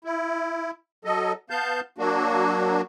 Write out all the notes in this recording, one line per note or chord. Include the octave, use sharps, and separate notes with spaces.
E4
F#3 A4 D#5
B3 F5 A5 G6
F#3 A#3 D4 F#4